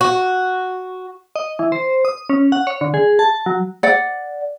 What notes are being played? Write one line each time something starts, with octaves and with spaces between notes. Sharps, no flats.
F#4
D#5
E3
C5
D#6
C#4
F#5
C#5
D3
G#4
A5
F#3
D5 F#5